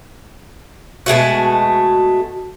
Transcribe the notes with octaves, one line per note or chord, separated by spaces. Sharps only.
B2 G#3 A3 F#4